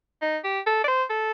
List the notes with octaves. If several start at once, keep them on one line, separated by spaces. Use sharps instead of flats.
D#4
G4
A4
D5
C5
A4